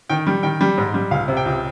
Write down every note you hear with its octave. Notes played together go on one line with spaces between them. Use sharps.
D#3 G5
G3
D#3 G5
G3
G#2
G3
C#2 F5
C3
G5
C#2